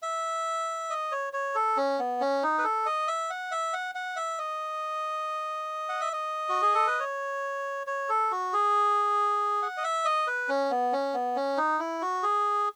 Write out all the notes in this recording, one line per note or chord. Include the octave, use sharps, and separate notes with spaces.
E5
D#5
C#5
C#5
A4
C#4
B3
C#4
D#4
B4
A4
D#5
E5
F#5
E5
F#5
F#5
E5
D#5
F#5
E5
D#5
F#4
G#4
A4
B4
C#5
C#5
A4
F#4
G#4
F#5
D#5
E5
D#5
B4
C#4
B3
C#4
B3
C#4
D#4
E4
F#4
G#4